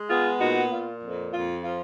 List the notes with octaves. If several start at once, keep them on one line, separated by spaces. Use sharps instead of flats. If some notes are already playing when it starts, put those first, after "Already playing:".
Already playing: G#3
B3 F4 G#4
A#2 D#4 F#4
A#2 F4
F2
F2 F4
F3 F4